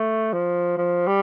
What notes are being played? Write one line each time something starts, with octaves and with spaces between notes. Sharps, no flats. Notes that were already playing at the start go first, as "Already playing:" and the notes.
Already playing: A3
F3
F3
G3